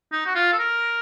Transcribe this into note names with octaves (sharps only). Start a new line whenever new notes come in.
D#4
F#4
F4
A4
A#4